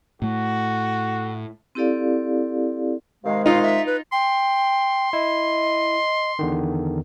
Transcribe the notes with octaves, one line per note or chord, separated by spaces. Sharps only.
A2 A3 F#4
C4 E4 G4 A4 D5 F5
C3 D#3 G#3 F5
D#4 F4 F5
E5
B4
G5 C6
E4 D#5
E2 D3 D#3